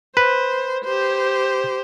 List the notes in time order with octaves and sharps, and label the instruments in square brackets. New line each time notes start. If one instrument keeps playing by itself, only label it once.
[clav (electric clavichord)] B4 [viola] C5
[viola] G4 C5